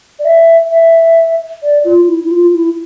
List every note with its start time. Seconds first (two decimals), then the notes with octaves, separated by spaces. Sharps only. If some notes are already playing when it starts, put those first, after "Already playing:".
0.19 D5
0.25 E5
0.71 E5
1.62 D5
1.84 F4
2.08 E4
2.24 E4
2.31 F4
2.53 E4